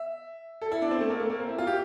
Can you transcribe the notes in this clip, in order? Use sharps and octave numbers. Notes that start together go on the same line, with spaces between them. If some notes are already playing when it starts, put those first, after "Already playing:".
Already playing: E5
A4
E4
D4
C4
A3
A#3
A3
A#3
C4
E4
F4
G4